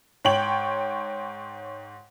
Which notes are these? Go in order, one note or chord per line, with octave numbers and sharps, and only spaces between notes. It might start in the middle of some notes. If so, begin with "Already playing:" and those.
G#2 C#5 G5 F#7